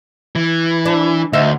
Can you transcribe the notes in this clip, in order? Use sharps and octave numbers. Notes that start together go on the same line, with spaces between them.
E3
D4
D2 D#4 E5 F5